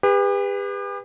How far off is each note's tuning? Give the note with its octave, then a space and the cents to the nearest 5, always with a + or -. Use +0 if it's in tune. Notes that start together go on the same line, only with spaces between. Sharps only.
G4 +45 B4 +0